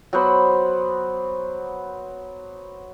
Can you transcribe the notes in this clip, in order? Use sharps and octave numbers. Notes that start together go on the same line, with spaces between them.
F#3 B3 C5 B5